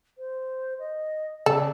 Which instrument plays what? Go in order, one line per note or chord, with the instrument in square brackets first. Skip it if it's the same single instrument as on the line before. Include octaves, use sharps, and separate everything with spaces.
[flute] C5
D#5
[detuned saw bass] C#3 [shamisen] A4 [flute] D5